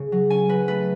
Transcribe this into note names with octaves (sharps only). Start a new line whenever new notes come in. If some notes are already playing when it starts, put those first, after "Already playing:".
Already playing: C#3
F#3
C#4 G#5
F#3 B4
A3 B4